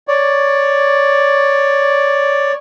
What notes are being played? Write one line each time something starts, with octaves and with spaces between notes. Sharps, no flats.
C#5 D5